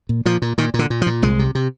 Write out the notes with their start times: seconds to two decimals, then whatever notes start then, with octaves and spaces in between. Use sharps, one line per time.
0.09 A#2
0.25 A#2 F3
0.42 A#2
0.58 A#2 D#3
0.74 A#2
0.79 D3
0.90 A#2
1.02 F3
1.07 A#2
1.22 C2 G#3
1.39 C3
1.55 C3